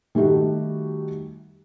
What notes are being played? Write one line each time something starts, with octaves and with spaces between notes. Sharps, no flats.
D#3 G3 A3 F#4 G4